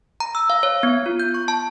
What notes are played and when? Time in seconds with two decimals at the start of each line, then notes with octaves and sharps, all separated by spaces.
0.20 A#5
0.35 E6
0.50 F5
0.63 C#5
0.83 B3
1.06 F4
1.20 G6
1.34 C#6
1.48 A5